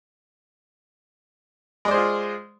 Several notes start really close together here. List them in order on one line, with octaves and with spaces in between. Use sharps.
G#3 D5 C5 G#4 F4